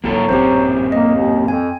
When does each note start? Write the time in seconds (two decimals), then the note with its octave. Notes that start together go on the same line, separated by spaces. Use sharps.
0.04 G2 C#3 F#3 A#3 F4 A4
0.29 A1 F#2 A#2 C4 C#4 G4 C5
0.92 A#3 D#5
1.15 D#2
1.48 F2 G#5